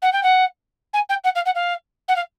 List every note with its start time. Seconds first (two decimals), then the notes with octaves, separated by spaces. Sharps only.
0.02 F#5
0.12 G5
0.23 F#5
0.93 G#5
1.09 G5
1.24 F#5
1.35 F5
1.45 F#5
1.54 F5
2.08 F#5
2.15 F5